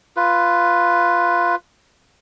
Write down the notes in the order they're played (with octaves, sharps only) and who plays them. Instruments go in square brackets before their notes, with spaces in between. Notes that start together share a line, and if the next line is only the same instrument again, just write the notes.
[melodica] F4 B4